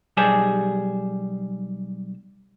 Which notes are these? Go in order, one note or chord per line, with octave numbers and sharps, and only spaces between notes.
B1 G3 G4 G#4 C5 A5